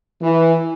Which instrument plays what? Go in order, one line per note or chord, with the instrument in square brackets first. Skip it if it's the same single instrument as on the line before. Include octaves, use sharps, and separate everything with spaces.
[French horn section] E3